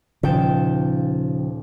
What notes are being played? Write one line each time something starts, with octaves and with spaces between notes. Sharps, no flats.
D#1 C#3 F3 G5 A5